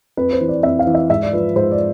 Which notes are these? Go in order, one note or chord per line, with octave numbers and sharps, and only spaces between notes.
F2 B4
C5
E3
D5
F2 E5
F5
E3
E5
G#2 E5
D5
F3 B4
G#2 C5
D5